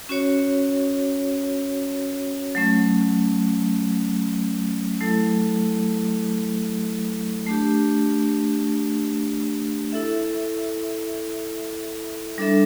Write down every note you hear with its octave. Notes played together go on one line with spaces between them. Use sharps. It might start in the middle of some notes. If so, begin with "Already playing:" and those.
C#4 F#4 C#5
F#3 A3 C#4
F#3 A3 E4 A4
A3 D4 G4
E4 A4 E5
G3 D4 A4 E5